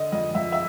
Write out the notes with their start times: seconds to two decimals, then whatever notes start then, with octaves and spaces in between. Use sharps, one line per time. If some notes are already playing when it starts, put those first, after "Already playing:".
Already playing: D3 D#5
0.12 F2 D#5
0.35 F2 E5
0.52 E5